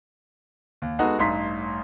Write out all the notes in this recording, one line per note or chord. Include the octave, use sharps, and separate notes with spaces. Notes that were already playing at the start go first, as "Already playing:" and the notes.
D#2
G#3 B3 D#4 F#4 A4 F#5
A1 G2 D#4 C6 B6